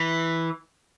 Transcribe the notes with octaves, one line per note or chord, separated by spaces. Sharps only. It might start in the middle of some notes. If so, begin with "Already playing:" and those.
Already playing: E3